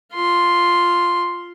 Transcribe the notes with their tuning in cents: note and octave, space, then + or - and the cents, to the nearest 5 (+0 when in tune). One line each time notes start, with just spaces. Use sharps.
F4 +0 C6 +0